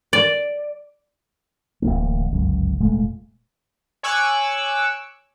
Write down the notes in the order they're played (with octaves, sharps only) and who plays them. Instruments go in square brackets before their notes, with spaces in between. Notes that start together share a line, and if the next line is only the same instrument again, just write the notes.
[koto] D5
[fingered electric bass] D1 A1 B2 A#3
G1 C#2 F#2
F1 A#2 G#3 A3
[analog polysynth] C#5 G#5 C#6 D6 E6 F#6